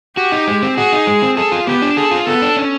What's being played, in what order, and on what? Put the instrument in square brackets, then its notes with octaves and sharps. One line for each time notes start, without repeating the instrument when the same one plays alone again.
[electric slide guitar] F#4 [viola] G4
[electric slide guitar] D#4
G#3
C4
[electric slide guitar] F#4 [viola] G#4
[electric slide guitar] D#4
G#3
C4
[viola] G#4 [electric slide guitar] A4
[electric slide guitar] F4
[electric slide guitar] B3 [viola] G4
[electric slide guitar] D4
[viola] G#4 [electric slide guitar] A4
[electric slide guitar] F4
[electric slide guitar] B3 [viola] A4
[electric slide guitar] D4
C#4